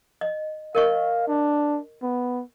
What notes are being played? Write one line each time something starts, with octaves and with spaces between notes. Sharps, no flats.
D#5
A#4 D#5 F5 C#6
D4
B3